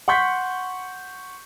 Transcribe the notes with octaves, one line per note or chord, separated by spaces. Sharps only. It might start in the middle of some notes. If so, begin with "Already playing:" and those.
F#5 C6 C#6 G6 B6